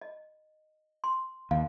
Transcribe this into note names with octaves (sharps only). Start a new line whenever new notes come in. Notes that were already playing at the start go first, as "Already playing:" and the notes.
D#5
C6
D#2 F5